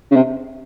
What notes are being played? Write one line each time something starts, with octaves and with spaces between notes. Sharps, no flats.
C#3
C3